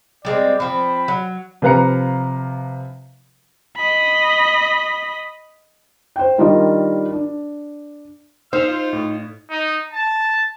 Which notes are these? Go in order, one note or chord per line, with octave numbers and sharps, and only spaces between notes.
G3 G#3 C4 D5
F3 C4 B5
F#3
C3 F3 B4 F5 A#5 C#7
D#5 B5
C5 G5
D#3 G3 D4 F4 A#4 D#5
D4
D#4 C5 F5 E6 F6
F4
A2
D#4
A5